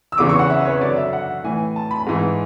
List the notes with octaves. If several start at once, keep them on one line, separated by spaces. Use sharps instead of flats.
E6
E2 C#3 E3 D6
C#6
F#5
E5
B4
C#5
F#2 D3 D5
E5
F#5
A2 E3 G#5
A5
B5
G#2 E3